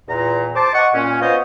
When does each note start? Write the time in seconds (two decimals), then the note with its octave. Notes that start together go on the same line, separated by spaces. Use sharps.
0.08 E2 A#2 A#5
0.55 C5 A5 D6
0.74 D#5 F#5 C#6
0.94 A#2 C#4
1.20 B3 F4 F#4 C5 C#5 D#5